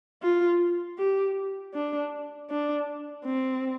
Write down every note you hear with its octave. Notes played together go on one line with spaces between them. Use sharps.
F4
G4
D4
D4
C4